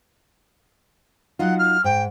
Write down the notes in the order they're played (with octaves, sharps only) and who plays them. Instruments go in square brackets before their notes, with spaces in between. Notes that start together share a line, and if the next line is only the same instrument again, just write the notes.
[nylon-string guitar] F#3 D#4 F4 [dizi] F#5
[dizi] F6
[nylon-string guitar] G#2 [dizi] G5